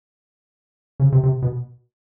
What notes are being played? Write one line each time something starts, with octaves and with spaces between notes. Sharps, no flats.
C#3
C3
C3
B2